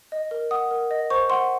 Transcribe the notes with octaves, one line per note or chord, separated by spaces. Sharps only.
D#5
A#4
F#5 D#6
A#4
D#5
C5 C#6
F#5 C6